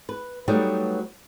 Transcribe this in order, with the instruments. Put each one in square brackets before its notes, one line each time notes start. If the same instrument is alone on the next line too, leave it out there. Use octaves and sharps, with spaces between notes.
[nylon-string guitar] B4
F#3 G3 A3 B3 D#4 G4